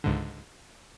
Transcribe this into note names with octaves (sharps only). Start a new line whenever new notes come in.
C#2 G#2 D3